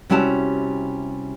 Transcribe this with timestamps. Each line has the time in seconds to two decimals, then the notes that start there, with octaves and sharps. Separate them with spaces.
0.10 C3 G3 C#4 E4 F#4 A5